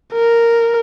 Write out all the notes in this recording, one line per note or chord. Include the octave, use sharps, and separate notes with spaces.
A#4